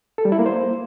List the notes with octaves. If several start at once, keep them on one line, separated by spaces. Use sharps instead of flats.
A4
G3
E4
A#3
C5